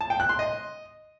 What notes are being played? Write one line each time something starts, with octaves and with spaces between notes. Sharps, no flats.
A5
G5
F#6
C6
D#5